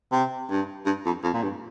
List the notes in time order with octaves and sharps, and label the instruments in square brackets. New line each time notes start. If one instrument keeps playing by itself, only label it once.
[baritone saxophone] C3
G2
G2
F2
F2
A#2
G2